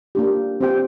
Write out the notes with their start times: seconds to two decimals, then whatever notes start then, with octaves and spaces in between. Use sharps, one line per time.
0.15 A#3 D4 G4
0.61 C4 G4 C5 G5